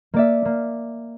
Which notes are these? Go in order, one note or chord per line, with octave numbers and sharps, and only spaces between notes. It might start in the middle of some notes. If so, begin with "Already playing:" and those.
A#3 D5 E5
A#3